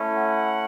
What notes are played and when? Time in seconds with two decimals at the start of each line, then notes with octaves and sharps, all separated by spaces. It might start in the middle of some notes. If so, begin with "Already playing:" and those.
Already playing: A3 C#4 E4
0.16 F#5